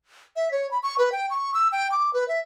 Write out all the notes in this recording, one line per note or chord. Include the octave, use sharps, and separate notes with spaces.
E5
C#5
B5
C#6
B4
G5
C#6
E6
G5
D6
B4
E5